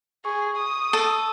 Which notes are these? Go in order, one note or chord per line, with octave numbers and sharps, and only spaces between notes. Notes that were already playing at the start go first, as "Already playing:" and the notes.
G#4 C#6
D#6
A4